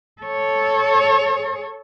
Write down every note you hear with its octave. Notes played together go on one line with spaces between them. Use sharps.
A4 C#5